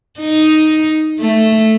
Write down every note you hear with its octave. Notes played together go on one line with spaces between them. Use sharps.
D#4
A3